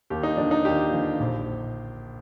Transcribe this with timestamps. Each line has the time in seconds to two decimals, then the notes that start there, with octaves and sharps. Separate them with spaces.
0.10 D#2 G4
0.23 D#4
0.37 D3 F3 D4
0.51 D#4
0.65 D#2 G4
0.93 D3 F3
1.20 A#1